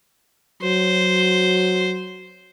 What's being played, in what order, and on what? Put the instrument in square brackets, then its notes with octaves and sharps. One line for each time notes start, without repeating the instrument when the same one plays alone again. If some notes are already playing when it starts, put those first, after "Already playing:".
[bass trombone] F#3 [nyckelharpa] C5